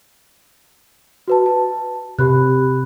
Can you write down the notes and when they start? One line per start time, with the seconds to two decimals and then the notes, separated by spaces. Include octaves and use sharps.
1.28 F#4 B4 A5
1.46 A5
2.19 C3 G4 B5 F#6